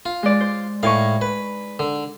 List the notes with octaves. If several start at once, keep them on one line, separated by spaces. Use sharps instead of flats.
F4
G#3 D5
C5
A2 D#4 F5 G#5 C#6
B4
D3